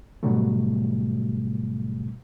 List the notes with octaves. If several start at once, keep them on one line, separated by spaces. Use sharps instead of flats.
G#2 B2 D3 F#3 G3 A3